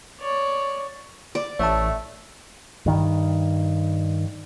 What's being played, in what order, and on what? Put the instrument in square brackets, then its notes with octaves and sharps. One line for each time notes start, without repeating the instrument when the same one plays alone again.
[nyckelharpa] C#5 D5
[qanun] D5
[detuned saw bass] A1 [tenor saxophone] A3 [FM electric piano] C#5 E5 A5
[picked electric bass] G2 D#3